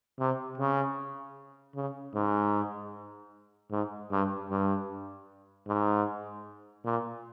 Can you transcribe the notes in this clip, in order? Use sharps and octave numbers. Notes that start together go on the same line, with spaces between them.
C3
C#3
C#3
G#2
G#2
G2
G2
G#2
A#2